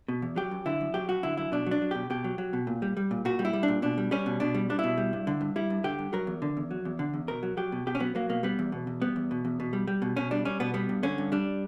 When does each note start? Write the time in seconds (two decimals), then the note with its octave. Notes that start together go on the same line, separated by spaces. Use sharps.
0.08 B2
0.22 E2
0.36 F#3 G4
0.51 F#2
0.66 D3 E4
0.81 F#2
0.94 F#3 G4
1.09 F#2 F#4
1.23 D3 E4
1.37 F#2 E4
1.52 B2 D4
1.66 F#3 D4
1.82 F#3
1.91 B2 G4
2.10 B2 G4
2.24 F#3
2.38 F#3
2.53 B2
2.67 A#2
2.82 G3
2.97 G3
3.11 A#2
3.25 A#2 F#4
3.39 G3
3.45 E4
3.53 G3
3.63 D4
3.68 A#2
3.82 B2 D4
3.98 G3
4.11 G3 C#4
4.26 B2
4.40 B2 D4
4.54 G3
4.70 G3 D4
4.79 B2 E4
4.97 G3
5.13 G2
5.27 D3
5.41 G2
5.56 G3 E4
5.70 G2
5.84 D3 G4
5.99 G2
6.13 F#3 A#4
6.27 E2
6.42 D3
6.57 E2
6.71 F#3
6.85 E2
6.99 D3
7.14 E2
7.28 B2 A#4
7.43 F#3
7.57 F#3 G4
7.72 B2
7.87 B2 G4
7.95 C#4
8.00 F#3 B3
8.15 F#3 A#3
8.29 B2 A#3
8.43 G3 B3
8.59 E2
8.72 B2
8.87 E2
9.01 G3 B3
9.16 E2
9.31 B2
9.45 E2
9.60 B2
9.73 G3
9.87 G3
10.02 B2
10.16 B2 C#4
10.31 G3 D4
10.45 G3 C#4
10.60 B2 B3
10.74 G3 B3
10.89 G2
11.03 D3 C#4
11.18 G2
11.32 G3 D4